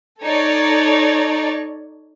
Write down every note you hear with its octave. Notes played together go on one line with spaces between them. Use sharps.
D#4 A4 C#5 D5